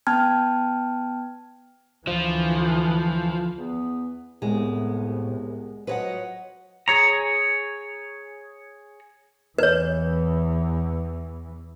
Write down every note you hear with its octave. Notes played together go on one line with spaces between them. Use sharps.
B3 G5 A5 F6 G#6
D2 E3 F3
E2 B3
C2 A2 G#3 B3
F3 F#3 B4 C#5 D#5 F#5
G#4 C#5 A#5
E2 E3 B4 C#5